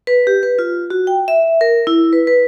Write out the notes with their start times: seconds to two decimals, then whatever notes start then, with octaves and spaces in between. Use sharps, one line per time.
0.07 B4
0.27 G4
0.43 B4
0.59 F4
0.90 F#4
1.07 G5
1.28 E5
1.61 A#4
1.87 E4
2.13 B4
2.27 B4